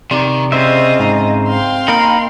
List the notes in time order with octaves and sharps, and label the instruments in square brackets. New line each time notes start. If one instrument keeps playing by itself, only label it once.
[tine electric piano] C3 D5 C6 [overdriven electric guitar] D#3
[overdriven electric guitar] C#3 [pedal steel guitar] C4 C5 E5 [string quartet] F4 D#5
[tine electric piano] G#2 A#5
[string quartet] F5 G5 C6
[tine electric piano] A#3 [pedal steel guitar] D#4 A#4 [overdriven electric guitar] B5